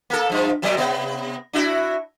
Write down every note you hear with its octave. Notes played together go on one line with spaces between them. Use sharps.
A#3 A4
G2 F3
F#2 B2 F#3
C3 B3
D4 E4 F#4